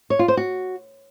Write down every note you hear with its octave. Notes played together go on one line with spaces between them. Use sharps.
C#5
F4
C5
F#4